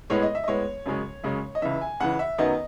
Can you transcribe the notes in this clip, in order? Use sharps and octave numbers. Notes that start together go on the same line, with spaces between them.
A2 G#3 B3 C#5
D#5
E5
D#5
A2 G#3 B3 C#5
F#2 C#3 G#3 C#4
F#2 C#3 G#3 C#4
D#5
C#2 C#3 E3 E5
G#5
C#2 C#3 E3 F#5
E5
F#2 D#3 F#3 B3 D#5